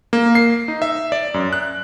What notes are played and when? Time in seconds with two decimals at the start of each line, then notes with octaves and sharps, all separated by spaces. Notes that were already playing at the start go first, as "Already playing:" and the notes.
0.13 A#3
0.35 C7
0.68 D#4
0.82 E5
1.12 D5
1.34 F#2
1.53 F#6